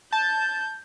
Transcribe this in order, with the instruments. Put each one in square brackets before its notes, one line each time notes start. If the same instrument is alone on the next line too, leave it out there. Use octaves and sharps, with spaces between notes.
[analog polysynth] A5 [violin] G6